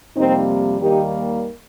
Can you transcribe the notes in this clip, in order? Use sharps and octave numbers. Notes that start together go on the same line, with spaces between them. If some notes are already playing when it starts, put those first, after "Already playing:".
F2 C3 G3 A#3 C4 D#4
D#2 D#3 G3 A#3 D#4 G4